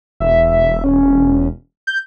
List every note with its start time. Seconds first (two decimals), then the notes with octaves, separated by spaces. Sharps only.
0.20 E1 E5
0.84 C#4
1.87 G6